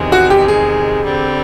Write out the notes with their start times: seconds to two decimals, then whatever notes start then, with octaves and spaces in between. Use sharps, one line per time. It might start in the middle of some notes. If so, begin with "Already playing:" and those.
Already playing: E2 C3 D#3 G#3
0.12 F#4
0.30 G4
0.48 G#4
1.03 D3 G3 C4